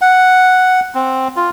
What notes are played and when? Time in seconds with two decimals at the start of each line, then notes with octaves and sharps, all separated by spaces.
0.01 F#5
0.95 C4
1.37 F4